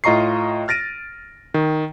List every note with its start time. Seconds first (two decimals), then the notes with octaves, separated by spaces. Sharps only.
0.04 A2 F4 D#5 A#5 C#6 C7
0.68 F6 A6 A#6 D7 D#7
1.54 D#3